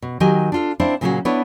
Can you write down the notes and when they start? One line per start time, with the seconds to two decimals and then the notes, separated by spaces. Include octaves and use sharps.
0.02 B2
0.20 D#3 F#3 G4 A#4 D#5 G#5
0.52 D4 F4 A4
0.80 C4 D4 E4 C5 F5
1.01 A#2 C#3 F#3 A#3 C#4 F#4
1.25 B3 D4 E4 B4 C#5